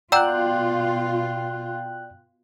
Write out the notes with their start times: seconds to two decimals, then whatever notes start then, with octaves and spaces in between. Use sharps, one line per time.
0.12 B2 F4 D5 F#5 G5 A#5 E6 F#6